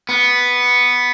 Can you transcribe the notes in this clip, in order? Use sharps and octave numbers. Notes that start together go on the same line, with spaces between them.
B3